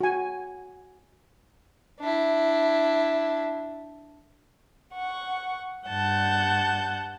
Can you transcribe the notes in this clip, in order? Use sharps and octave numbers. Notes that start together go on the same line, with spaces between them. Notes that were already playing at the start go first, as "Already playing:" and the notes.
F#4 G#5
D4 E4
F#5 C#6
G2 F#5 A5 G6